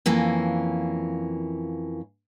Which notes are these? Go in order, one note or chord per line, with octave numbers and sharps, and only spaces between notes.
F2 E3 A#3 C#4